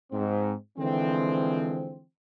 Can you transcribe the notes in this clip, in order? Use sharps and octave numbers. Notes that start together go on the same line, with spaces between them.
G#2 C4
D3 E3 F3 G#3 C4